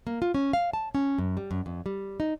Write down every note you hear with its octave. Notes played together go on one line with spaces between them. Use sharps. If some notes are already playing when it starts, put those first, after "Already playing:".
A#3
F4
C#4
F5
A5
C#4
F#2
G3
F#2
F2
G3
D#4